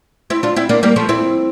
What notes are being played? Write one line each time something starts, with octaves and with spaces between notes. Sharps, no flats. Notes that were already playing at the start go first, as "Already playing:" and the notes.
C4 E4
D4 F4
C4 E4
A#3 D4
G3 A#3
F3 A3
C4 E4